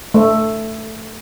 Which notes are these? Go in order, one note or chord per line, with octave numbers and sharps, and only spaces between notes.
A3